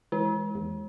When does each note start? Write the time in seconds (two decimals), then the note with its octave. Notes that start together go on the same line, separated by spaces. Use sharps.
0.12 E3 G#3
0.55 E2